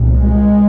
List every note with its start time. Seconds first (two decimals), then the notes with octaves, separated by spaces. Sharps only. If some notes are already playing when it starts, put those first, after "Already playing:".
Already playing: C2 A#2
0.15 G#3